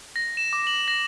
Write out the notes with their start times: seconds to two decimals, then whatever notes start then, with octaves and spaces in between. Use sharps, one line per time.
0.16 A#6
0.37 E7
0.53 D6
0.67 F#7
0.88 A#6